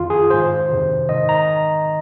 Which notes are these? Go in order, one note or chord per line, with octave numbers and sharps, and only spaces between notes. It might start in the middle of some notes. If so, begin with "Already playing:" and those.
Already playing: F2 D#3 F4
G#4
G#2 D#3 C5
F2 C3 D#3
G#2 D#3 D#5
A#5